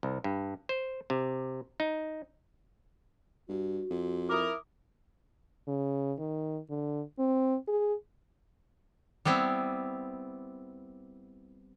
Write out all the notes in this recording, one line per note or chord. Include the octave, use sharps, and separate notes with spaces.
C2
G2
C5
C3
D#4
G2 F#4
F2
E4 A#4 D6 D#6
C#3
D#3
D3
C4
G#4
G3 B3 C4 E4